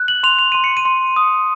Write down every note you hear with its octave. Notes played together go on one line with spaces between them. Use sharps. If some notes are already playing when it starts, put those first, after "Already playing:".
Already playing: F#6
F#7
C6 F7
F7
C6 D#7
C#7
D#7
C6
D#6